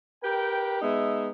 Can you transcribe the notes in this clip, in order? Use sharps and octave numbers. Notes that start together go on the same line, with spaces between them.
G4 A#4 B4 G5
G#3 B3 D#4 E5